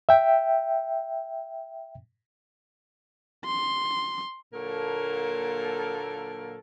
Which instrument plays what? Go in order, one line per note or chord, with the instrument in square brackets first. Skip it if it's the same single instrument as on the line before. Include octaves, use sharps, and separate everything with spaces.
[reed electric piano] E5 G5
[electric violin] C6
[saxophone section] A#2 D3 F#3 A#3 A4 A#4